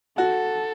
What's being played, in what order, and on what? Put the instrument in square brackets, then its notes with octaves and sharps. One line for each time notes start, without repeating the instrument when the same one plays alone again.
[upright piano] F#4 [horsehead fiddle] A4